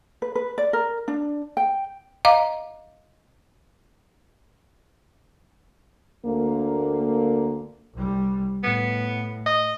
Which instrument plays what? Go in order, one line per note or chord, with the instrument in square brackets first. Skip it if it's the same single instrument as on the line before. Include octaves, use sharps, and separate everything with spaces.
[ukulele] B4
B4
D5
A#4
D4
G5
[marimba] D#5 F5 A#5 D6
[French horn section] D2 D3 A#3
[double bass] C2 G3
[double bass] A2 [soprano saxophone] B3
[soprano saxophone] D#5